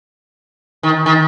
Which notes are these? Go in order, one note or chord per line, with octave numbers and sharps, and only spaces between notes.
D#3
D#3